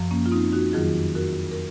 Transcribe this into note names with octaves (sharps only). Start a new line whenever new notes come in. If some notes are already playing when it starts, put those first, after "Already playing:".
Already playing: F#2 F3
A#3 C#4
F4
C4 D#4
D#4 F#4
F2 D#3 F#3 F4 G#4
F#4 A#4
A#4